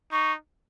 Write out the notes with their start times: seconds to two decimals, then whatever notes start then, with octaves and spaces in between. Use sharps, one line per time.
0.12 D#4 C#6